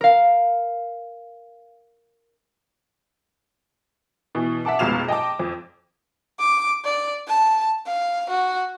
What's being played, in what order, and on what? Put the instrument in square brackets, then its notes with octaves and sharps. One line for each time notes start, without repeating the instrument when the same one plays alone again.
[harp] A#4 F5
[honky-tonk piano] B2 E3
E5 F#5 A5 D6
F1 C#2 B2 F5 E7 F7
D#5 G5 A5 D6
F2
[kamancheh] D6
D5
A5
F5
F#4